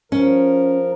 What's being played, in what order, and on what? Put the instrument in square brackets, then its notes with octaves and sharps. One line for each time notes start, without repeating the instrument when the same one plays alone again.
[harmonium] F3 A#4 [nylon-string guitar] C#4